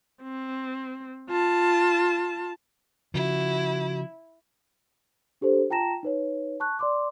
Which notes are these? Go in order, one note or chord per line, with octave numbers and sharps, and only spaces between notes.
C4
F4 A5
C#3 F3 E4 F#4
D4 G4 A4 C5
F4 G5 A5 A#5 A#6 E7
D#4 B4 C#5
A5 C#6 F#6
D5 C6 D6